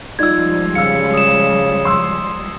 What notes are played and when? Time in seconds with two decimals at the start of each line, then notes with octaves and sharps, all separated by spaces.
0.19 F3 G3 G#3 D#4 F4 D5 E6 G#6
0.75 C#3 F5 E6 C#7
1.14 D#6 E7
1.85 C6 E6